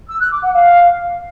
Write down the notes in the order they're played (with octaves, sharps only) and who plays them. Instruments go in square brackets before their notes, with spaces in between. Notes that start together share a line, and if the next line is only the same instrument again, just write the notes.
[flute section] E6
F#6
D6
F#5
F5